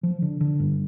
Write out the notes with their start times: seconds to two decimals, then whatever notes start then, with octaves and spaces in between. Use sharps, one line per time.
0.03 F3
0.22 D3
0.41 D3
0.60 G2